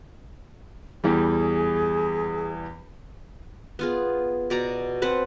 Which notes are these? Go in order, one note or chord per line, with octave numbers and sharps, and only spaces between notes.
E2 E3 G3 G#4
B3 F4 G#4
B2 D5 A#5
C4 B4 F#5 A5